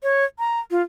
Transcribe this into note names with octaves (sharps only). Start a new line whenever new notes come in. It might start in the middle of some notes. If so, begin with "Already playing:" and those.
C#5
A#5
F4